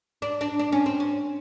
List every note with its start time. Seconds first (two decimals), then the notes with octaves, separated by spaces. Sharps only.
0.22 D4
0.41 D4
0.59 D4
0.72 C#4
0.86 C4
1.00 C#4